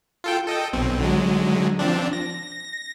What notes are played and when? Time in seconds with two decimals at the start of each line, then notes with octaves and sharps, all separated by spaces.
0.24 F4 A4 G5
0.47 A4 D#5 G5
0.73 B1 B2 C4
1.01 D3 F#3 G#3
1.79 F3 C4 D4
2.13 A#6